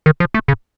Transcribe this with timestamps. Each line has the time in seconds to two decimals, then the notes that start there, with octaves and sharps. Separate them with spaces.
0.06 D#3
0.20 F3
0.34 A3
0.48 C#3